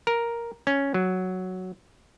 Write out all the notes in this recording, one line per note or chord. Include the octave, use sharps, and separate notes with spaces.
A#4
C#4
F#3